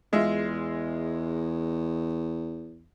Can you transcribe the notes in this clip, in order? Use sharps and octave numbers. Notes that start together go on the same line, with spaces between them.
E2 G#3 F4 E5